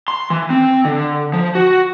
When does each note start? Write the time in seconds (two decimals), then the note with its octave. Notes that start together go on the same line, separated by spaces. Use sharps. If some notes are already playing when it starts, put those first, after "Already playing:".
0.08 C6
0.30 E3
0.50 C4
0.85 D3
1.33 F3
1.55 F#4